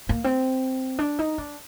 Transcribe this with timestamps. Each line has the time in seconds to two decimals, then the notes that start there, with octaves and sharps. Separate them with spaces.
0.09 A#3
0.24 C4
0.99 D4
1.19 D#4
1.38 D4